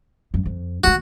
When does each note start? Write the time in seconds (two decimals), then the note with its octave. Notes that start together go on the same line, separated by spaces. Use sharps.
0.34 F#2
0.46 F2
0.84 D#3 A#3 F#4